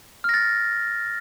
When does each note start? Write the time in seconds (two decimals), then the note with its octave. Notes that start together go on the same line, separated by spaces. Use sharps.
0.24 F6
0.29 A#6
0.34 A6